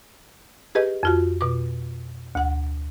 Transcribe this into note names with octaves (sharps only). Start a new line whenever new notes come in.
G4 G#4 B4 D#5
F2 F4 F#4
B2 D6
D2 F#5